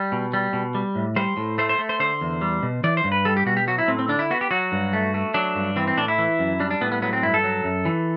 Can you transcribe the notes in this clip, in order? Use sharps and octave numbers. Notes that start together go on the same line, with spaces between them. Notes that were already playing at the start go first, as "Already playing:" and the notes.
Already playing: G3
B2
G3
B2
G3
A2
G3 C5
A2
A3 C5
C5
A3
C5
D3 C5
E2
G3
B2
E3 D5
C5
G2
B4
G3 A4
G4
B2 F#4
G4
F#3 F#4
E4
A2 C4
C4
D3 D4
E4
B3 F#4
G4
F#3 F#4
G2
A3
A3
F#3 D4
G2
E3 C4
C4
A2 D4
E4
E3
F#2
G3 D4
D4
A2 B3
B3
F#3 B3
C4
G2 E4
A4
F#3
F#2
E3